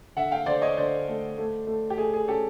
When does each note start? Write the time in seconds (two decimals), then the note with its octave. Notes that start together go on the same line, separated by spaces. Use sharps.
0.16 D3 E5 F#5
0.32 F5 G5
0.46 D3 C5 D5
0.62 C#5 D#5
0.77 D3 C5 D5
1.08 A3
1.38 A3
1.67 A3
1.90 G4
1.97 A3 G#4
2.14 G#4
2.28 C#4 G4 A4